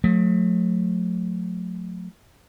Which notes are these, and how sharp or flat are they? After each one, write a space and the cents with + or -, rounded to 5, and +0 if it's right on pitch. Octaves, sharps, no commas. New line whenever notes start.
F#3 -45 A3 -10